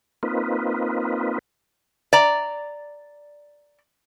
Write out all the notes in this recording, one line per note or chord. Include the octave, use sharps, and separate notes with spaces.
A#3 C4 D#4 F4 B4
D5 A#5